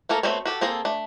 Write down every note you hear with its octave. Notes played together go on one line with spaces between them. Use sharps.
A3 A#3 A4 A#4
A3 B3 C4 F#4 C#5
F#4 G4 A4
A#3 C4 G#4 A4
A3 D4